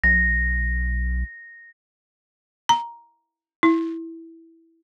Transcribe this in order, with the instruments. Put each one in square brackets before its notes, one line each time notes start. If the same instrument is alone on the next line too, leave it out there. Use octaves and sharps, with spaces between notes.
[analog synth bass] B1 [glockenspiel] A#6
[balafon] A#5
E4